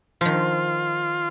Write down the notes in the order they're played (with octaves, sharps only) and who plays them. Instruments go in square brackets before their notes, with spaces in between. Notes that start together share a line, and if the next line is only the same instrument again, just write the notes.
[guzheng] D#3 F3 [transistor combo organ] F4